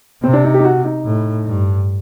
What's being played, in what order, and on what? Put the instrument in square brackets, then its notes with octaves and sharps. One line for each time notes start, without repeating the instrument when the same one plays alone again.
[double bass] C3 [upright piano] C4
[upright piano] D4
D#4
G4
D#4
F#4
D#4
[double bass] A2
G2